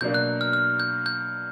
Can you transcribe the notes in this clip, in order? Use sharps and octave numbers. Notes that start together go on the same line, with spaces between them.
B2 F#3 A#3 D4 G6
F#6
F6
F6
G6
G6